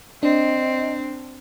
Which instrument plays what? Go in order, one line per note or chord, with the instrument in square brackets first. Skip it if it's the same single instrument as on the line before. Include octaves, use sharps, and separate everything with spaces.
[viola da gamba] C4 [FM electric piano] D4 [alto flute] D#5